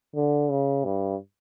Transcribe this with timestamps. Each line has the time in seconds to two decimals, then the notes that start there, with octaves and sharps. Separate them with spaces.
0.16 D3
0.51 C#3
0.85 G2